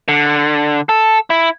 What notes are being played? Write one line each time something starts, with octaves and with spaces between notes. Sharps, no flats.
D3
A4
E4